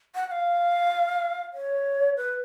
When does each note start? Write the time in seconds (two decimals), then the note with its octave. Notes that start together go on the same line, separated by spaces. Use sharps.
0.15 F#5
0.26 F#5
0.31 F5
1.53 C#5
2.17 B4